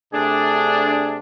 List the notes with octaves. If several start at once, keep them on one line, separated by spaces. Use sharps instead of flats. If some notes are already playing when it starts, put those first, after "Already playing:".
C3 A3 D4 G#4